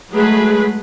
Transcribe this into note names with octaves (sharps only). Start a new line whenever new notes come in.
F#3 G#3 A3 G#4 B4 B5